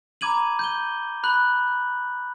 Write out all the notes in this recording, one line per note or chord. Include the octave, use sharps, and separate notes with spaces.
A#5 B5 D6 G#6 D#7 F#7
G6 D#7 G7
B5 F#6 F#7